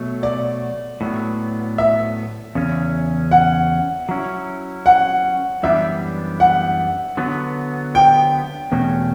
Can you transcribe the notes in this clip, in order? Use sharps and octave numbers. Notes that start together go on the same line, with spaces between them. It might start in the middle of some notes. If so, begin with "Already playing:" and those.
Already playing: B2 F#3 A3
D5
A2 F#3 B3
E5
E2 C#3 C#4
F#5
F#3 C#4 E4
F#5
F#2 E3 G3 B3 D4 E5
F#5
D3 F#3 B3
G5
E2 B2 A3 C#4 F#4